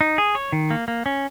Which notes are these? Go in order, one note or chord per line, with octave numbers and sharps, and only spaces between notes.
D#4
G#4
C#5
D#3
A#3
A#3
C#4